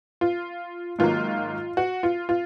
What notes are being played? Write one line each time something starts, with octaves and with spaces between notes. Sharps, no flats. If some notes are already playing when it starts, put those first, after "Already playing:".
F4
G#2 D#3 F#3 A#3 F4
F#4
F4
F4